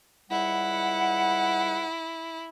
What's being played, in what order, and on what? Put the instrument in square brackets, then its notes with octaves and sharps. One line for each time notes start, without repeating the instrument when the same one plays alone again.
[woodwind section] C#2 G3 F#5 [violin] E4